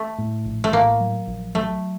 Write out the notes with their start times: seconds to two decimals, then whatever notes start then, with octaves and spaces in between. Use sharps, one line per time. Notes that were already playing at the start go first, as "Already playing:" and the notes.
Already playing: A3
0.18 A2
0.45 A#1
0.64 A3
0.73 A2 A#3
1.00 F#3
1.27 A#1
1.54 F#3 A3